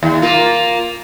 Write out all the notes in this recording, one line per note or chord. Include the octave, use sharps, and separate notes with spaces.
D#2
A#3 F4